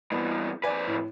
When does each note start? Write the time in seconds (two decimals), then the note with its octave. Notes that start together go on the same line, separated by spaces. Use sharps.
0.12 G2 E3 B3
0.64 F2 B4 D5 G#5
0.88 A2